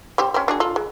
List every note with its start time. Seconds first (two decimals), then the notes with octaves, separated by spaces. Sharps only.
0.18 C4 G4 C5
0.34 C4 C#4
0.48 D4 F#4 G#4
0.60 F4 A4
0.76 G#3